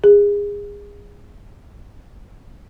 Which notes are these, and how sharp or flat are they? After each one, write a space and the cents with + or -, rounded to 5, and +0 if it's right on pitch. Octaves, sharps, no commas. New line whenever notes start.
G#4 -25